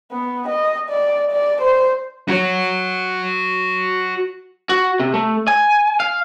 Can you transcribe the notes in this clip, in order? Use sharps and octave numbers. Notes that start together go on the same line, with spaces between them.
B3
D#5
D5
D5
C5
F#4 C#5
F#4
C3
A3
G#5
F5